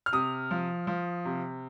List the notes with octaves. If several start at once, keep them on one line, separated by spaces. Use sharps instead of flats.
F6
C3 D#6
F3
F3
C3